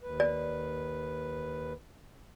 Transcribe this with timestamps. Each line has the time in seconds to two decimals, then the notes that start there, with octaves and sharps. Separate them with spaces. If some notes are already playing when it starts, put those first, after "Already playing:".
0.01 D#2 B4
0.20 D5